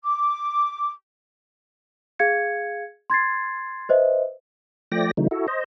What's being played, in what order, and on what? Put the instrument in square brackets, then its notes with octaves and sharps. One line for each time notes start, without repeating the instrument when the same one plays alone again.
[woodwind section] D6
[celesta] G#4 F5 G#6 C#7
C6 G#6 A6 C7
B4 C5 D#5 E5
[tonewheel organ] F3 A3 D5 G5 A#6
C#3 E3 F#3 A3 D#4
E4 F#4 A4
C5 D#5